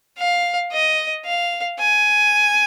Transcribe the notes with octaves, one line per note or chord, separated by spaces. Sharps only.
F5
D#5
F5
G#5